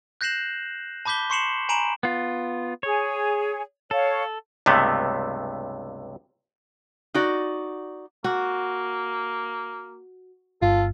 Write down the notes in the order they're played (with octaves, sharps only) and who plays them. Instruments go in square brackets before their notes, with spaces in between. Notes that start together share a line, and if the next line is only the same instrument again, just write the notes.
[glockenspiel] F#6 G6 A#6 C7 E7 F#7
A5 B5 D6 G6 B6 G7
C6 C#6 C7 C#7 E7 F#7
G#5 A#5 B5 D7 E7 F#7
[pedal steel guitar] B3 F4
[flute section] G#4 [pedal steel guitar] C#5
[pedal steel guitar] A4 [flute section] C#5 F5
[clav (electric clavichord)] C#2 G2 C3 A3 B3
[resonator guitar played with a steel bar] D#4 F#4 D5
[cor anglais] A#3 [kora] F#4
[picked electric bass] G1 [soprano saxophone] F4 [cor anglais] A4